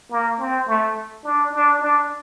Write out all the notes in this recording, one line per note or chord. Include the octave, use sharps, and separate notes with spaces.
A#3
C4
A3
D4
D4
D4